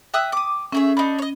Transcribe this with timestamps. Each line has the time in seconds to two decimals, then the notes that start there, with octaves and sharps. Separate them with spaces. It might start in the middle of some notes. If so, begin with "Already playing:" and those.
0.14 E5 G5 D#6 E6 F#6
0.32 D6 D#6
0.72 A3 C#4 G#4 E5
0.97 D4 D#4 B5
1.19 C#5 D#5